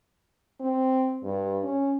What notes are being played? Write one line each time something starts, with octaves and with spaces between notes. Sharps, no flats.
C4
G2
C#4